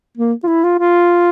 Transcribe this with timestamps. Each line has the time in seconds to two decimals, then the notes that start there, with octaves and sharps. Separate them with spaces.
0.17 A#3
0.43 F4
0.47 E4
0.64 F4
0.79 F4